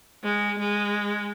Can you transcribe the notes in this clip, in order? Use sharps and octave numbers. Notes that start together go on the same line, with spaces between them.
G#3
G#3